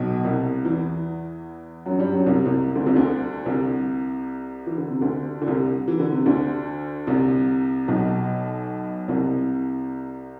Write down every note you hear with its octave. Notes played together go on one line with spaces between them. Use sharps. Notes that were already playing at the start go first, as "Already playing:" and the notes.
Already playing: B1 B2
C2 C3
E2 E3
F#2 F#3
G2 G3
F#2 F#3
C2 C3
C2 C3
D2 D3
C2 C3
D2 D3
C2 C3
E3
D3
C3
D2 D3
D3
C2 C3
E3
D3
C3
D2 D3
C2 C3
B1 B2
C2 C3